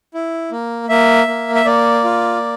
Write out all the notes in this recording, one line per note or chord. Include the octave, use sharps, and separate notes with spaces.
E4
A#3
A#3 E5
A#3
E5
A#3 D5
F4